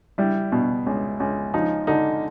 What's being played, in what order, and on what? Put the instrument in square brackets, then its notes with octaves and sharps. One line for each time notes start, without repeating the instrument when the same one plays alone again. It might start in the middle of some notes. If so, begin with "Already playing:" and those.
[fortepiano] G3 [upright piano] E4
[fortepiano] B2
C#2
C#2
[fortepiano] F3 [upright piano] D#4
[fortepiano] D3 [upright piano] D#4